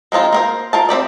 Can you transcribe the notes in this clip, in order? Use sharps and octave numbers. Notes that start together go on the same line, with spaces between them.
G#3 C4 D#4 F4
A#3 A#4 C5
F4 A#4 A5
C4 D#4 G4 D5